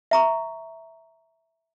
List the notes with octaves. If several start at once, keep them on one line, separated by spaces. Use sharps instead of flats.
E5 A#5 C#6